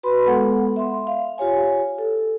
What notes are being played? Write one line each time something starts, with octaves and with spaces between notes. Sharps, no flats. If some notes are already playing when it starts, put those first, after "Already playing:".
F#4 B4 B5 C6
G#3 B3 A4 F#5
E5 C6
F5
F4 G4 C#5 G#5
A4